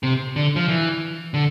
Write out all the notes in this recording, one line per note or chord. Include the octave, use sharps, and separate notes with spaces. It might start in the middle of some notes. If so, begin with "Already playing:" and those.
C3
D3
F3
E3
D3